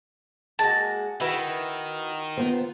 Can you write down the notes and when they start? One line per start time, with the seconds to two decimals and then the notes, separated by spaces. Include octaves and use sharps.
0.59 G#3 A#3 F#4 A5
1.21 D#3 E4 F#4 B4
2.38 B3 F4 C5